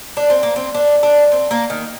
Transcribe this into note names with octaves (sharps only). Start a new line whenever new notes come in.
D4
C4
A#3
C4
D4
D4
C4
A#3
D#3